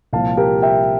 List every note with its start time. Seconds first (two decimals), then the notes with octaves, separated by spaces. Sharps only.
0.13 C2 A#2 F3 F5 A5
0.37 G4 A#4
0.62 E5 G5